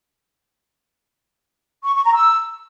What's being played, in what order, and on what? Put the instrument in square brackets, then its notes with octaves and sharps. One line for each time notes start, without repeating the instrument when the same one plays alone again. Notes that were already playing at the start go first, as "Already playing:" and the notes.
[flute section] C#6
C#6
A#5
E6